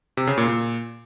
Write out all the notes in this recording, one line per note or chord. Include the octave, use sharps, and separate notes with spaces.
C3
C#3
A#2
A#2